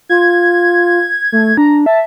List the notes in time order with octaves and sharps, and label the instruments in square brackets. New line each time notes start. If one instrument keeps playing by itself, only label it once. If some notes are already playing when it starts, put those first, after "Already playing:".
[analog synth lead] F4 [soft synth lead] G#6
[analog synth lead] A3
[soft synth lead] D4 [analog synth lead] A#5
[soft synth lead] E5 [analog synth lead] A5